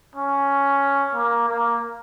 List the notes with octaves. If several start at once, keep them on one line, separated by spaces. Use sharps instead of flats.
C#4
A#3
A#3